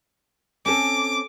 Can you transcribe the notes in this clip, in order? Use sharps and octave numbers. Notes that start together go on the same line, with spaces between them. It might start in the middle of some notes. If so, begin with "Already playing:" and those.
C4 C#4 A4 D6